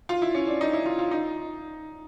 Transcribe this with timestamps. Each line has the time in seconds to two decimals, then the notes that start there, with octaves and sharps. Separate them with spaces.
0.09 F4
0.22 E4
0.34 C#4
0.47 D4
0.61 D#4
0.73 E4
0.86 F4
0.99 F4
1.11 D#4